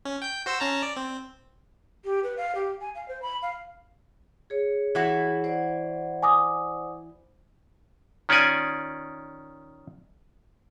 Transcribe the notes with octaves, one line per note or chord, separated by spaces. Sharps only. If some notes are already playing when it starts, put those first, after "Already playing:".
C#4
G5 G6
F#4 C5 E6
C#4 A5 A#5
D5
C4
G4
B4
F5
G4
G#5
F5
C5
B5
F5
G#4 C#5
E3 E4 F#4
C5 D5 F#5
G#5 D6 D#6
D#3 C#4 F4 D5 G#5